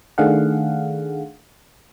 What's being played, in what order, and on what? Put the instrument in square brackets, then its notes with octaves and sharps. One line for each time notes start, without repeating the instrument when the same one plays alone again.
[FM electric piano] D#3 A3 D4 G#4 F5 F#5